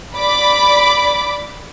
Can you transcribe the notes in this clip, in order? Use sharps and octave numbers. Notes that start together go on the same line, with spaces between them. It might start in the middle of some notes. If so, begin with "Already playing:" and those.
D5 B5 D6